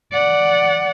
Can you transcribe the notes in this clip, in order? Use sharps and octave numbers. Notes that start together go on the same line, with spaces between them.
D5 F#5